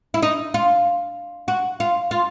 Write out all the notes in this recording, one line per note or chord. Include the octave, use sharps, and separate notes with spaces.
E4
D#4
F4
F#4
F4
F4